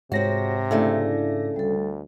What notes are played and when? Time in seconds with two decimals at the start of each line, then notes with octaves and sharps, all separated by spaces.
0.12 G#2 C3 C4 F#4 C#5 A#6
0.71 C#3 A3 D4 E4 D5
1.56 D2 G3 A4